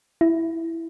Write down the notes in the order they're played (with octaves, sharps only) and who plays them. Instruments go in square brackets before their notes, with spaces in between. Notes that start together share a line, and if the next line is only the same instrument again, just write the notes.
[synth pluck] E4